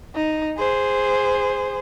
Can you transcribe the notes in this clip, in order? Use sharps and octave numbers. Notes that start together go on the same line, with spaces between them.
D#4
G#4 C5